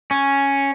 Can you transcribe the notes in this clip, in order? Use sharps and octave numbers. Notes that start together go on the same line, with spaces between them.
C#4